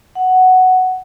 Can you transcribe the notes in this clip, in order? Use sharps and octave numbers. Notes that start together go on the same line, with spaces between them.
F#5